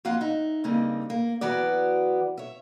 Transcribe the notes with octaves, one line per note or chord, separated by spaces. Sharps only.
F2 A#3 F4 F5 F#5
D#4 E5
G2 C#3 A#3 C4 D#4
A#3
E3 F#3 B3 F#4 D5
C#5 E5